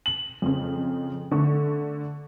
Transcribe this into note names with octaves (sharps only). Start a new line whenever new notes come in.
F#7
F2 C#3
D3 A3 C#6